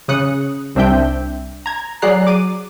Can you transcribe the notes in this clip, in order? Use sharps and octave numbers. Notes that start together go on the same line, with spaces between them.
C#3 D#6 F#6 C#7
C2 C4 D4 E5 G5 G6
A#5 G#6
F#3 G#4 D5 A#5 F#6 C7
D6 D#7